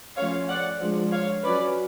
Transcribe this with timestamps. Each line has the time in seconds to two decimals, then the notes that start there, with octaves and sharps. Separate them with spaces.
0.16 F3 A3 C#4 C#5 F5
0.48 D5 F#5
0.80 F3 G#3 D4
1.11 C#5 F5
1.42 F#3 C#4 B4 D5